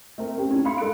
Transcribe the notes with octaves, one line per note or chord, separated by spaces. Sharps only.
A3 C4 A#4
C4 C#4 G4
C#4 D4
A3 F5 B5 C6 C#7
G#3 A4 A#4 F#6 D7